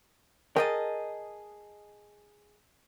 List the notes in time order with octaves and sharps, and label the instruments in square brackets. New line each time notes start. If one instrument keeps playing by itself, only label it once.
[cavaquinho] G#4 D#5 A5 [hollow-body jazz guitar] A#4 G5